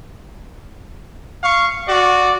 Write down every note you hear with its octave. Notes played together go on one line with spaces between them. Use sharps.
F5 C#6
F#4 D5